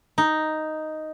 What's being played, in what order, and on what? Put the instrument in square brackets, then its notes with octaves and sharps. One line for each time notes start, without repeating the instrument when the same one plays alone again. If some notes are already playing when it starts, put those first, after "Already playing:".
[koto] D#4